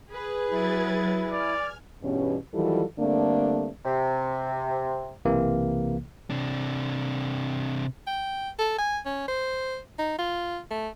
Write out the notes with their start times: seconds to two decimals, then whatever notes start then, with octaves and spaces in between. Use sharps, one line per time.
0.10 G#4 B4
0.49 F#3 E4 G#6 A6
1.31 D5 G#5 F6
2.02 E2 G2 B2 G3 C#4
2.54 D#3 E3 F#3 G3 F4 A4
2.98 G2 D3 A3 A#3 C4 D4
3.85 C3
5.25 B1 C3 E3 A#3
6.30 C3 D4
8.07 G5
8.59 A4
8.78 G#5
9.06 C#4
9.28 C5
9.99 D#4
10.19 F4
10.71 A3